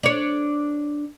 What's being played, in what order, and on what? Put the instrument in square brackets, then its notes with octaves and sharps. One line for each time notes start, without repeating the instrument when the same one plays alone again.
[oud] D4 C#5